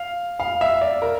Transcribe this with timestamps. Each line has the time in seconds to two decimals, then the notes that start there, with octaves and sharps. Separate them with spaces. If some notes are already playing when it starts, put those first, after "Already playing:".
Already playing: F5
0.40 F5
0.61 E5
0.81 D5
1.02 A#4